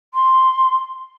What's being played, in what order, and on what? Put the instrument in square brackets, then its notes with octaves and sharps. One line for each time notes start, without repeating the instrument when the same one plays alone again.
[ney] C6